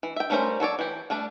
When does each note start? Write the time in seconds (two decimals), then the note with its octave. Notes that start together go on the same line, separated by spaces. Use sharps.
0.03 E3
0.16 E5 G5
0.30 G3 A3 C#4 A#4 C5
0.60 F#3 A4 C#5 D5
0.79 E3 G4
1.10 G3 A3 D4 D5